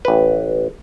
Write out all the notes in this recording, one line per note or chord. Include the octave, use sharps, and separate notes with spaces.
A1 B4